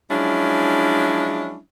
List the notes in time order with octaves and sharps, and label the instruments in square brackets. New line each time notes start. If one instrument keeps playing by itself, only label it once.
[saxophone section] F3 F#3 G#3 C#4 D4 E4